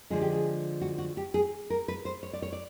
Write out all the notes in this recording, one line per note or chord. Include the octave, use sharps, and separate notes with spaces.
D3 F3 G#3 G#4
G4
G#4
F#4
F#4
G4
G#4
A#4
B4
C5
C#5
D5
C#5
D5